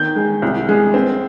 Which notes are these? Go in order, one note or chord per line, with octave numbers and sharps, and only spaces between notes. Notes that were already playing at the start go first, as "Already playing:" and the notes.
Already playing: D#3 G6
G#3
C2
G#3
C4